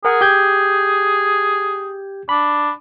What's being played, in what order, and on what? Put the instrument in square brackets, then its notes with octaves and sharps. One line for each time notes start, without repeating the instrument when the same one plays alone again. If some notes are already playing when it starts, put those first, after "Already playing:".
[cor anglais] G#4 [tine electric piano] A#4 F#5
[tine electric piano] G4 G6 G#6
[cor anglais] D4 [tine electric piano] B5